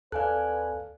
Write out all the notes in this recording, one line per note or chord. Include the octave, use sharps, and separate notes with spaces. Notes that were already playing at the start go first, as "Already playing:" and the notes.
D#2 C4 A4 B4 D5 F5 G#5 F#6